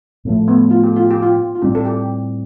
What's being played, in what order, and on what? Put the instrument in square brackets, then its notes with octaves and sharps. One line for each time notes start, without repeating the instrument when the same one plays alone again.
[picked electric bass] A2 F3 A3
[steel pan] B3
F4
G4
F4
G4
F4
F4
[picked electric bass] A2 G3 C4 [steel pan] G4
[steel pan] A4
G4